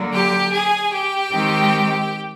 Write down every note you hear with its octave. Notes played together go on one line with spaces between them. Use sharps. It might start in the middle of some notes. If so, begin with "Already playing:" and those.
Already playing: D3 F#3 A#3
G4 G5
G#4 G#5
G4 G5
D#3 G#3 C4